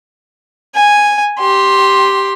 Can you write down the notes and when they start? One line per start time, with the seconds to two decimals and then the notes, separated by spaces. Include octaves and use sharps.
0.75 G#5
1.38 G4 C6